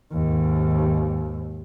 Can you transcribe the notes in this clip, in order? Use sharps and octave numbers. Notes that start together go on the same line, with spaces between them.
D#2 G#2